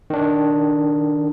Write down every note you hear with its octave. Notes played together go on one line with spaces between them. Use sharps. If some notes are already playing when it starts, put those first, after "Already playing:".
D#3 D4